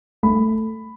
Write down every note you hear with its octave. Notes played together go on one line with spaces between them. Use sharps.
A3 B5